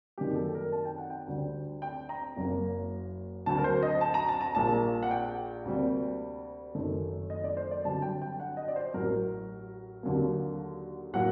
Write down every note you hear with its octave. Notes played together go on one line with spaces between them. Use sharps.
F#2 D#3 G3 A#3 G4
A4
A#4
A5
G5
F#5
G5
D2 D3 G3
G5
A#5
F#1 F#2 F#3 A#3
D2 D3 F#3 A5
A#4
C5
D#5
A5
A#5
A5
A#5
A#1 A#2 G3 A#3 A5
F#5
G5
D2 C3 G3 A#3
F#1 F#2 D#3 A3
D#5
D5
C5
D5
G1 G2 D3 F#3 A5
G5
G5
F#5
D#5
D5
C5
A1 A2 F#3 A#4
D#2 D3 F#3 A#3
A2 F#3 A#3 F#5